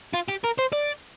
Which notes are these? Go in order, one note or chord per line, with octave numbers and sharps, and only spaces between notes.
F4
G4
A#4
C5
D5